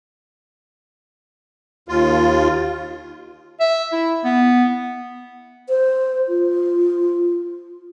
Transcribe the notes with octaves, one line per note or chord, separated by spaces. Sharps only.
D#2 F4
E5
E4
B3
C5
F4